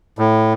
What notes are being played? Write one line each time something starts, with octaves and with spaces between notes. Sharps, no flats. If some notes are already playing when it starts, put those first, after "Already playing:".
A2